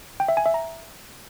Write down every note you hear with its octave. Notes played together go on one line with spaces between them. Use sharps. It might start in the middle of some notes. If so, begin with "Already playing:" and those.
G5
E5
G#5
E5
A#5